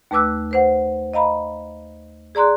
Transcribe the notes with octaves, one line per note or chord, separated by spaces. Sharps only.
D#2 A3 B4 D6 E6 F#6
B4 C5 F#5
D#5 F5 A#5 B5
G#4 D5 A#5 C6 F#6